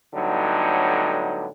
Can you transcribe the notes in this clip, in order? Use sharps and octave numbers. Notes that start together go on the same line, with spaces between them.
A2 D3 F#3 G3 B3 D#4